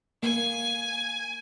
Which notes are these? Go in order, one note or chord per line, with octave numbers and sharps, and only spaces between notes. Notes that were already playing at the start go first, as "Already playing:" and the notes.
A#3 G#5